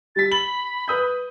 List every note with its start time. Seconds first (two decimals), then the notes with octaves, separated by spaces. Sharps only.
0.16 G3 A6 B6
0.32 B5 F#7
0.88 B4 D#6 G6